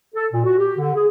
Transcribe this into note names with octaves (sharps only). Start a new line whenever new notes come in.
A4
A#2
F#4
G4
D3
G#4